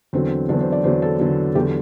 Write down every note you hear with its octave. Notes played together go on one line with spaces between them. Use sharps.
E2 D3 F#3 C4
E2 D3 F#3 D4
C5
D5
E2 D3 F#3 C5
A4
E2 D3 F#3
E2 D3 F#3 G4